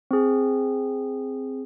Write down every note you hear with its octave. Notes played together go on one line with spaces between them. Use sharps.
C4 G#4